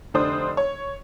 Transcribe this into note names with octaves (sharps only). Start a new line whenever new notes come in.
F1 D3 D4 C5 D#6
C#5